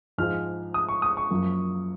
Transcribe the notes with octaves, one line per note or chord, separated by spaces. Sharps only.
G#2 F3 G#3 F6
D#6
C#6
D#6
C#6
F#2 F3 A#3